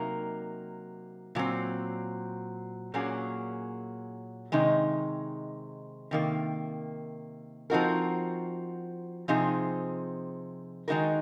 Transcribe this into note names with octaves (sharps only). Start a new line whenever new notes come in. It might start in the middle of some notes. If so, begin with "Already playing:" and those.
Already playing: C3 F#3 A#3 D#4 A#4
A#2 F#3 C4
A#2 F#3 A#3 C#4 G#4
C3 D#3 G#3 D#4
C3 D#3 A#3
F3 C4 D#4 F#4 A#4
C3 F3 C4 D#4 G#4
D#3 G#3 D#4 F#4 A#4